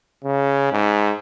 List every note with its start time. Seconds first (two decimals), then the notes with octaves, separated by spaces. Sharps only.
0.24 C#3
0.72 G#2